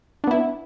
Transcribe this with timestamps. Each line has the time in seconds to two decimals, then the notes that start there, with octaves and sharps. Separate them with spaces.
0.24 D4
0.27 B3
0.31 E4